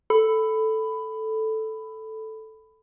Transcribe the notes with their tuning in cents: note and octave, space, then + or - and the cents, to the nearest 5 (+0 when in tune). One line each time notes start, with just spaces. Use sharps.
A4 +0 B5 +15